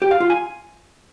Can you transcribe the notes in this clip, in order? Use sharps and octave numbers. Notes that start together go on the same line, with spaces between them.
G4
F5
F4
G#5